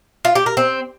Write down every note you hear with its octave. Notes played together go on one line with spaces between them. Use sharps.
F4
G4
A#4
C4